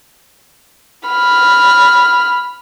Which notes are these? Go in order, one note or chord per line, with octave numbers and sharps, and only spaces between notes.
B5 F6